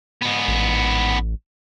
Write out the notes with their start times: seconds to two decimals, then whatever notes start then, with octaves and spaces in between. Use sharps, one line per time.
0.22 G#2 B3
0.48 A1